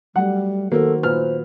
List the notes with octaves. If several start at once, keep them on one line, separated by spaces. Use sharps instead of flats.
F#3 G3 A3 F#5
D#3 A#3 F#4 A4 C5
A#2 B4 C5 F6